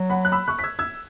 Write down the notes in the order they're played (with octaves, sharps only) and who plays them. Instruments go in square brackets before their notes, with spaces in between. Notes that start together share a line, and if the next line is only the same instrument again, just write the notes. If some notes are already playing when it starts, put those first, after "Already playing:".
Already playing: [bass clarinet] F#3
[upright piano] F#5 B5
F#6
B5 E6
C#6 F#6
B6
E6 G#6
E6 G#6